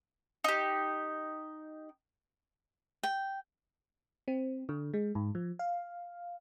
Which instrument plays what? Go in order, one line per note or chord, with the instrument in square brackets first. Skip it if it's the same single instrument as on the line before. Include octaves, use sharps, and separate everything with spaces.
[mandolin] D#4 G4
[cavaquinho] G5
[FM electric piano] C4
D3
G#3
G#2
F3
F5